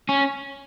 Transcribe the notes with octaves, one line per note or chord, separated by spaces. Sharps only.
C#4